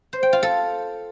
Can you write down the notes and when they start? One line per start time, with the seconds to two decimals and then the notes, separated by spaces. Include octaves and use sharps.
0.13 C5
0.23 G5
0.33 F4
0.43 A4